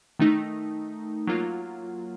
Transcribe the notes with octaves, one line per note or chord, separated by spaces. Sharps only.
D#3 A3 D#4
F#3 A#3 F4